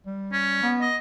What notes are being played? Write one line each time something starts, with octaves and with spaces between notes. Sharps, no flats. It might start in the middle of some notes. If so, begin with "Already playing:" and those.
G3
C#4
B3
D#5